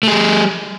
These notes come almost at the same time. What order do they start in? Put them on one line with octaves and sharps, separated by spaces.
A3 G#4 G3